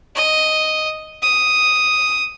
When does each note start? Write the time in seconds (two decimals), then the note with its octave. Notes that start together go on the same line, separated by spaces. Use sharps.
0.16 D#5
1.22 D#6